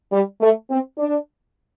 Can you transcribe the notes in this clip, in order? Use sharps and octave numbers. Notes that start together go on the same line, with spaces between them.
G3
A3
C4
D4